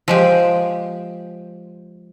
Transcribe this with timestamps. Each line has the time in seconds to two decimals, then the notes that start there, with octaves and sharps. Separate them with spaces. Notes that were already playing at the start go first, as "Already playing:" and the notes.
0.08 F3 G#3 G4